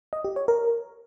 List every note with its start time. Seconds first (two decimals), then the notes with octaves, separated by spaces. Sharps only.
0.13 D#5
0.25 G4
0.36 C#5
0.48 A#4